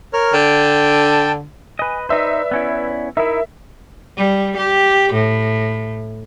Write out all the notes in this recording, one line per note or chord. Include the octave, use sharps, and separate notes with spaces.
A#4 C#5 F6
D3 G5 A5
B4 D#5 G#5
D#4 B4 C5 D5 E5
B3 C#4 E4
D#4 E4 A#4 E5
G3
G4
A2